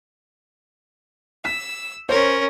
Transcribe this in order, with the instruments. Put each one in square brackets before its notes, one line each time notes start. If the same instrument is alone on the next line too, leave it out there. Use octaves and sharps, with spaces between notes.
[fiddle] E6 [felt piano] B6
[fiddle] C#4 A#4 [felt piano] C5 C#5